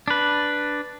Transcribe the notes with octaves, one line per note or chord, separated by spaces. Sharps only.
D4 B4